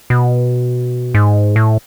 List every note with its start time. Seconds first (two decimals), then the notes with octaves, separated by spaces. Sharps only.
0.10 B2
1.14 G#2
1.56 A2